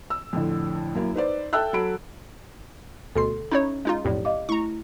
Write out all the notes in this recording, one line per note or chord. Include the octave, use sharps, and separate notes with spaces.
E6
F2 A2 D3
F#2 A#3 E4
D#4 B4 C5 D5
A4 E5 G5 A5 E6 F#6
F#3 A4 B5 D7
D2 B2 A4 C6 C7
C#4 D#4 E4 C#5
G#3 D#4 F4
B1 F2 A2 G4 D5
D#5 F5 D6
A3 E4 A#5 C#6